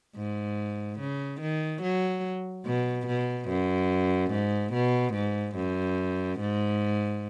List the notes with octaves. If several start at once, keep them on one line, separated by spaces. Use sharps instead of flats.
G#2
C#3
D#3
F#3
B2
B2
F#2
G#2
B2
G#2
F#2
G#2